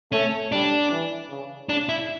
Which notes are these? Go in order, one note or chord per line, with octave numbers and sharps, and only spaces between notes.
A3 C#4
G3 D4
E3
C#3
C#3 D4
E4